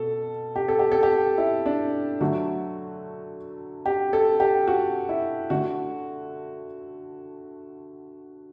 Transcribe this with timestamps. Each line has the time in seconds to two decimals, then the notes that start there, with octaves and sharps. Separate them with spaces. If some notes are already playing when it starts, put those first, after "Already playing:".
Already playing: B2 A4
0.56 G4
0.68 A4
0.79 G4
0.92 A4
1.03 G4
1.38 E4
1.66 D4
2.21 D3 F#3 A3 F#4
3.86 G4
4.13 A4
4.40 G4
4.67 F#4
5.09 E4
5.50 D3 A3 F#4